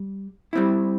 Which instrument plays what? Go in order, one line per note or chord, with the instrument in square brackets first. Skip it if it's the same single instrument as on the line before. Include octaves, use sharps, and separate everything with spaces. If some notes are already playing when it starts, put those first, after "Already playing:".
Already playing: [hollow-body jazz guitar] G3
G3 C4 E4